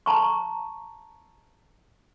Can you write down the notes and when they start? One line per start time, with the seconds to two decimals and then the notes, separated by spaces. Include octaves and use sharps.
0.06 A5 A#5 C#6